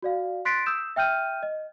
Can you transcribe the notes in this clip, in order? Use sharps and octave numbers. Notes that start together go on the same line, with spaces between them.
F#4 D5 F5
C6 F#6 A6 B6 C7 D7
D#6 E6 G6 E7
E5 G5 F6 G6 D#7
D#5